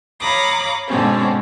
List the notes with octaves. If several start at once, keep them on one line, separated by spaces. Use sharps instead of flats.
C#5 F5 A#5 B5 D6 D#6
G#2 B2 D3 C4 C#4